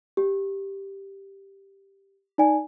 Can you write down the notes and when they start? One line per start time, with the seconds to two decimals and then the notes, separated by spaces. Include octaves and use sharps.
0.17 G4
2.38 D#4 D5 G#5